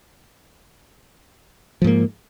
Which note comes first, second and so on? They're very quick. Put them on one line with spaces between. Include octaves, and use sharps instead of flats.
F3 G#2 A#3